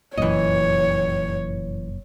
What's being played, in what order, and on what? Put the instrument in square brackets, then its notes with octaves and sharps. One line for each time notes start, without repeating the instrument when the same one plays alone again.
[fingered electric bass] F1 F#2 A#2 [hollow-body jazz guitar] E3 D#5 [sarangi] C#5